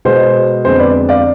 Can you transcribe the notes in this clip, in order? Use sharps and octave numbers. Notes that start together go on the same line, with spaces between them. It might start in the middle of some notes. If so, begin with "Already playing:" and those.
B2 G#3 B3 C5
F2 D3 G#3 B3 C5
B4 D5
D5 F5